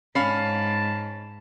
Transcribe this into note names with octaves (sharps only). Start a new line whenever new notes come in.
G#2 C#4 F5 A5 B5 C7